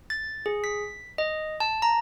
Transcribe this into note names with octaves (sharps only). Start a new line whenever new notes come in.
A6
G#4
B6
D#5
A5
A#5